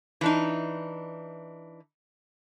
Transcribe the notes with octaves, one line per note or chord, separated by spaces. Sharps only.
E3 D4 D#4